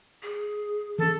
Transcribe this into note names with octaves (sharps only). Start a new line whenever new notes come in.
G#4
E3 C#4 A4